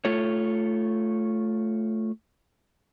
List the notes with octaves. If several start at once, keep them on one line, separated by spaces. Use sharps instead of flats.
A3 F4 A4 C#5